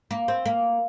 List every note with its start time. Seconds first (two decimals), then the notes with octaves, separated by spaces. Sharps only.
0.11 A#3
0.28 C4
0.46 A#3